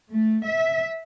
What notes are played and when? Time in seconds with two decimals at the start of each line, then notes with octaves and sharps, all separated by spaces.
0.12 A3
0.48 E5